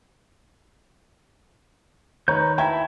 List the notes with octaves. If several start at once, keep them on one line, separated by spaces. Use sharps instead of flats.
D#3 B4 C#5 A#5 G6
E4 E5 G5 A5 A#5 G#6